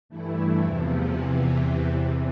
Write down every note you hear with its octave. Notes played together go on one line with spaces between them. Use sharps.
G2 E3 A3 E4
E2 C3 F3
E2 C3 E3